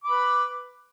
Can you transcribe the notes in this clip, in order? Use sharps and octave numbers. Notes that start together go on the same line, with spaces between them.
B4 B5 D6